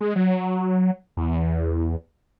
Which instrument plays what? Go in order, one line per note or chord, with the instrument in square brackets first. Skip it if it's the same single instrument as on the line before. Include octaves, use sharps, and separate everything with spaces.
[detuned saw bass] G#3
F#3
E2